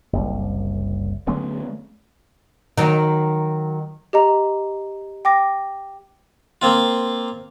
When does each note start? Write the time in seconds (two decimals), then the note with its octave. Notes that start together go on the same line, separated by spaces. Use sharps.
0.13 F#1 C2
1.27 D3 F#3 G#3 A3 B3 C#4
2.77 D#3 F#3
4.13 G4 D#5 A#5
5.25 G5 D6 A#6
6.62 A#3 C4 F4